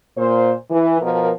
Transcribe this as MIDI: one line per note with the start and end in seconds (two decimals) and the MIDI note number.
0.17 0.53 46
0.17 0.53 72
0.69 1.00 52
1.00 1.29 47
1.00 1.29 53
1.00 1.29 70